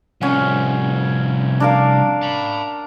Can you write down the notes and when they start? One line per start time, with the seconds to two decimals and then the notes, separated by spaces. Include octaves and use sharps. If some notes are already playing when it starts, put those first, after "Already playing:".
0.21 C2 F3 C#4 F#5
1.60 D4 A#4 F5
2.22 A5 B5